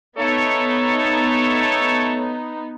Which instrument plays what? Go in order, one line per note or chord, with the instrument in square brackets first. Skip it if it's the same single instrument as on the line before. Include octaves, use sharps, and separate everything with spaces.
[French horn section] A3 A4 C#5 [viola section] B3 D#4